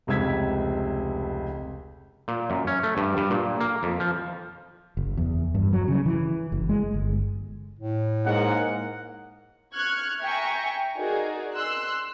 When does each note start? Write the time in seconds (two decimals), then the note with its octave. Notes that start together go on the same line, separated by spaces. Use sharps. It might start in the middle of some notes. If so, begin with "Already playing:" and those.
0.07 F1 C#2 C3 E6 G#6 B6
2.28 A#2
2.50 F#2
2.67 C#4
2.83 A3
2.97 G2
3.17 G2
3.30 A#2
3.61 A#3
3.83 F2
4.00 F3
4.97 F#1
5.17 E2
5.55 G2
5.73 F#3
5.88 C#3
6.06 E3
6.52 F#1
6.69 G#3
6.94 G1
7.79 A2
8.26 G#2 G#3 A#3 A#4 F#5
9.74 C#6 F6 F#6 G#6
10.23 E5 G5 G#5 A#5 C#6
10.98 D#4 F#4 G#4 A#4 D5
11.55 C6 E6 F#6